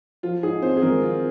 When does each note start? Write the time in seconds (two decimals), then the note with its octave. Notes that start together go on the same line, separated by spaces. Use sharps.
0.23 F3 F4
0.43 G#2 G#4
0.62 C4 C5
0.77 G#4
0.82 G#1 A#4
1.01 F3 F4